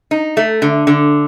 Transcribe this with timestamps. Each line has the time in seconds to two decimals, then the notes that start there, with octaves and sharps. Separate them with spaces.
0.11 D#4
0.37 A3
0.62 D3
0.87 D3